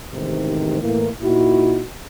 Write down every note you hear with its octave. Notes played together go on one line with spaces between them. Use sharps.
A1 G#2 C3 D#3
A2 E3 A#3
A#2 D#4 E4 F#4